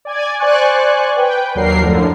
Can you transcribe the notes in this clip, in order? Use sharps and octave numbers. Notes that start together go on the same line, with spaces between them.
D5 G#5 G#6
C5 D5 G#5 C#6 F#6
B4 G5
D#2 F#3 D4 A#4 C7
F#2 A2 D3 F3